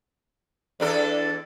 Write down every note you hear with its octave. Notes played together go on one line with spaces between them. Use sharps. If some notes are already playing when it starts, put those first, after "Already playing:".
E2 D4 A4